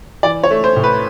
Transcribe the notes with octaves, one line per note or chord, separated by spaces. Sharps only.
E3 D5
C#5
A3
C5
A2
B4